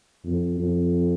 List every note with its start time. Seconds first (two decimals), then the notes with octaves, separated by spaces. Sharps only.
0.24 F2
0.59 F2